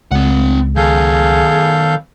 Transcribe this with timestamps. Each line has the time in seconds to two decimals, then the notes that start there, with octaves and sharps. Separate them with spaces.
0.12 C#2 C4 F#5
0.77 D#3 B3 G#4 A4 F5 G6